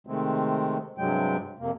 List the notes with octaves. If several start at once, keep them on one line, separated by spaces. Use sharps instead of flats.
C3 D#3 G#3 A3 C4
G2 C3 F#3 G#3 G5
F2 C3 A#3